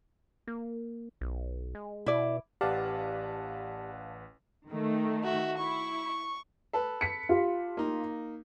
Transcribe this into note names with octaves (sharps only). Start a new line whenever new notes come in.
A#3
B1
G#3
B2 E4 D5
A1 G4 B4 D5 F5 F#5 A5
D#3 A3
F#4 E5
E4 C#6
A4 B4
B6 C#7
F4 G4
A#3 D#4